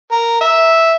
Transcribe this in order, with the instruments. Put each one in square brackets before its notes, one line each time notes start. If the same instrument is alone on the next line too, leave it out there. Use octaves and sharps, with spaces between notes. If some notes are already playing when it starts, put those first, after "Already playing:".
[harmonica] A#4
E5